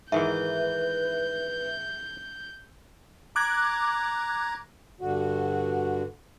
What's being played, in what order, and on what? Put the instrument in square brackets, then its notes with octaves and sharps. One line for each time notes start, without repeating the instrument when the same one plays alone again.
[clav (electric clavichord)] G#2 D#3 E3 [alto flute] B4 [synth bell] E5 [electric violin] G6
[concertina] A#5 [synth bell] D6 F#6 G#6
[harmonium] G2 D3 F#4